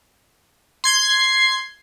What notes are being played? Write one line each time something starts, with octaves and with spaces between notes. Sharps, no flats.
C6 G#6 C7